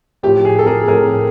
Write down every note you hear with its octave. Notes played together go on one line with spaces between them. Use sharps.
A2 F3 G4
G#4
A4
G#4 A#4
A2 F3 G#4 A#4